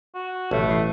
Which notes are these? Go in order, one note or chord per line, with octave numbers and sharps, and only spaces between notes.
F#4
A1 B2 E3 A3 F5
E3 D#5 C7